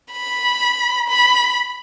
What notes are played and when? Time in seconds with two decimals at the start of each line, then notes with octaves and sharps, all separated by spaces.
0.12 B5
1.09 B5